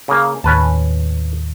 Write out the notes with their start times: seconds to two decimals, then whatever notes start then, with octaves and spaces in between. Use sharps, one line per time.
0.08 C#3 A#3
0.44 D#2 A2 C#4 B4 A5